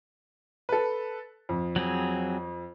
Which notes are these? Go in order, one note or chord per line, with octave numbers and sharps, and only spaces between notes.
A4 B4
F2
F#3 C4 G#4